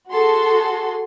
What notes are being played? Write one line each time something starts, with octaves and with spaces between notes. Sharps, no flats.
F#4 G#4 A4 C6